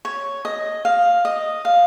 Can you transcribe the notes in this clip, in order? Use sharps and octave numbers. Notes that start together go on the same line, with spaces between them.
C#5
D#5
F5
D#5
F5